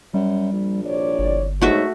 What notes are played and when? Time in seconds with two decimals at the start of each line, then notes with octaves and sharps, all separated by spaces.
0.14 F#2 G3
0.52 A#1
0.86 C2 C#5 D5
1.19 G1
1.61 G#2 B2 D3 F#3 A3 F#4 E5